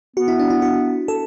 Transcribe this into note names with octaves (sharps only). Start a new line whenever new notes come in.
B3 F#4
E4
D4
E4
F#4
A4